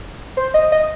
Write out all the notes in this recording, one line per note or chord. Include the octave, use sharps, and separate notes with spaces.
C5
D#5
D#5